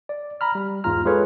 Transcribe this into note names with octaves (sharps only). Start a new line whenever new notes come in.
D5
A#5 B5 F6
G3
E2 G#2 F4 A#5 F6
G#3 F4 G#4 A4 B4 C#5